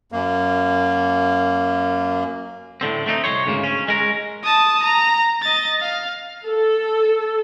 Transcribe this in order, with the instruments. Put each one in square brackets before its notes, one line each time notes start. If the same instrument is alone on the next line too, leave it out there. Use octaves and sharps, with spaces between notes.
[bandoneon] F#2 A#3
[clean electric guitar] A2 D3 C4
A3 C4 D4 D#4
C2 G2 C5 C#5
D2 G#2 C#3 A#3
C#4
G#3 A#4
[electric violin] A5 D#6
A#5
D#5 A6
F5
[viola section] A4